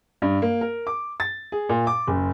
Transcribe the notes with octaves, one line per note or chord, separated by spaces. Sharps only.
G2
A#3
A#4
D6
A6
G#4
A#2
D6
F#1